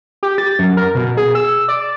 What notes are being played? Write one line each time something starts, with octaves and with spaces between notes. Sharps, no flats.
G4
A6
F#2
A#4
B2
G#4
E6
D5